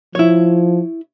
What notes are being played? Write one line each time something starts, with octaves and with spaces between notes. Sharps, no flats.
F3 E4 C#5